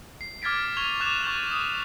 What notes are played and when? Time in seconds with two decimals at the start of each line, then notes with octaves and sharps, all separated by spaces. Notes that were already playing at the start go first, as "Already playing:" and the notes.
0.21 C7
0.42 D6 F6 G#6 A6 B6 D7
0.77 C#6 G#6 F7 G7
1.00 D6 F#6 G#6 E7 F7
1.23 C#6 G6 A6 F7 F#7
1.51 D#6